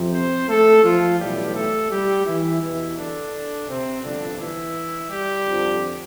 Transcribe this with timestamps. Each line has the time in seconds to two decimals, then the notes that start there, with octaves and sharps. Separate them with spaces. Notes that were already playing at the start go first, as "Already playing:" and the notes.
Already playing: F2 C3 F3
0.12 C4 C5
0.48 A3 A4
0.83 F3 F4
1.19 B1 A2 E3 G3 G4
1.55 A3 A4
1.91 G3 G4
2.26 E3 E4
2.61 E2 B2 E3 E4
2.97 D3 D4
3.68 C3 C4
4.03 G1 G2 D3 F3 D4
4.39 E3 E4
5.10 G3 G4
5.46 F2 D3 F3